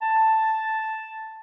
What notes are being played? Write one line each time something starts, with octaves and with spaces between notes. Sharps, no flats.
A5